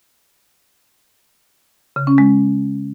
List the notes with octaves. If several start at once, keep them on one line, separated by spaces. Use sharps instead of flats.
C#3
C#4
G#3